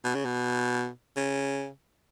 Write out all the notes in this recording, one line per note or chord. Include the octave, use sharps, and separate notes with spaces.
B2
C#3
B2
C#3